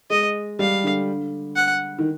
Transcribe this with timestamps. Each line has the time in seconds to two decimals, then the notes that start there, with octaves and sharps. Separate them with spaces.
0.10 G#3 D#5
0.59 G3 F5
0.84 D3
1.56 F#5
1.99 D#3